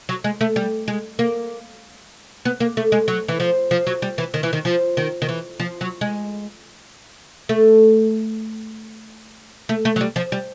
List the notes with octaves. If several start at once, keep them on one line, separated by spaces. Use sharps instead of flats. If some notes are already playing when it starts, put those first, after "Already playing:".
F#3
G#3
A3
G3
G#3
A#3
B3
A#3
A3
G#3
F#3
E3
F3
F3
F#3
G3
E3
D#3
E3
D#3
F3
D#3
D#3
E3
F3
F#3
G#3
A3
A3
A3
F#3
G3
F3
G3